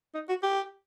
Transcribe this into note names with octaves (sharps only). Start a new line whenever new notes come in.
D#4
F#4
G4